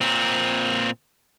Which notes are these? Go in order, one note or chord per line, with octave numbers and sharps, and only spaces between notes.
A#2 C4